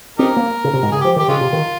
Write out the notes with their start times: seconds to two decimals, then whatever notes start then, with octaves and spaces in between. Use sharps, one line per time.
0.19 C4 D#4 G4 A#4
0.37 A#3
0.64 C#3
0.73 C3
0.82 G#2
0.92 C#3 G#4
1.01 F3 G4
1.16 D#3 G4
1.28 C#3 G#3 C#4 F4
1.41 C3
1.53 D#3